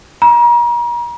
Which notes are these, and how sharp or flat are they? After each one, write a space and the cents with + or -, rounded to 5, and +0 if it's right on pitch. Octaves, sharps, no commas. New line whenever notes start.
A#5 +40